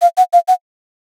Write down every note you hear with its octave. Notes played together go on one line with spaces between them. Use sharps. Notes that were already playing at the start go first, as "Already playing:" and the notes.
F5
F#5
F5
F#5